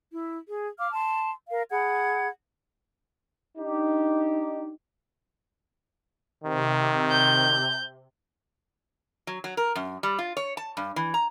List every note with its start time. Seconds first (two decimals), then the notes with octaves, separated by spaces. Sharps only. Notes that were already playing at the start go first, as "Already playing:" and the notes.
0.11 E4
0.48 G#4
0.79 F5 D6 F6
0.93 A5 C6
1.49 A#4 F5
1.71 G#4 F#5 B5 G#6
3.58 D4 D#4 G4
6.44 C3 D#3
7.11 G6
9.27 F#3
9.44 F#3
9.57 A#4
9.75 F#2
10.03 G3
10.19 F4
10.37 C#5
10.57 A5
10.77 G2
10.96 E3
11.14 A#5